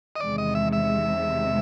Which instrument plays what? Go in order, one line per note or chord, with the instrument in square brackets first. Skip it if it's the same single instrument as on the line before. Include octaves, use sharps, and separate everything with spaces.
[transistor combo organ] D#5
[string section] E2 C3 D#3 G#3 [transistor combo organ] D5
[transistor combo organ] D#5
E5
E5